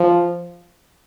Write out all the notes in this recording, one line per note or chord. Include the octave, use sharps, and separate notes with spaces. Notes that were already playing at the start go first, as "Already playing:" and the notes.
Already playing: F3